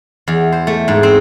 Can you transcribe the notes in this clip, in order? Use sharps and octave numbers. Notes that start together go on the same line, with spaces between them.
E2
C5
A3
G#2
C4